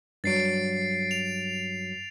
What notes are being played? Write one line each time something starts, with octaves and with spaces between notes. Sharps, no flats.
G2 F#3 A6 C7 D7
F7